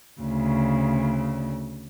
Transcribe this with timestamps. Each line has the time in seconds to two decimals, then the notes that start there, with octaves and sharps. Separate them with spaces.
0.21 D2 C#3